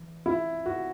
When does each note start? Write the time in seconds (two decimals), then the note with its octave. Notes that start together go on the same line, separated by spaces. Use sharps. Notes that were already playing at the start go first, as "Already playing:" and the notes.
Already playing: E2
0.26 E4
0.66 F#4